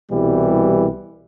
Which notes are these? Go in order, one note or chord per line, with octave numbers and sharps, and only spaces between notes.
C2 B2 E3 G3